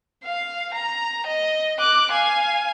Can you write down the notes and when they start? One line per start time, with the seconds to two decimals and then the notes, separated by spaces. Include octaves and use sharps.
0.24 F5
0.74 A#5
1.27 D#5
1.80 D6 F#6
2.12 F5 G#5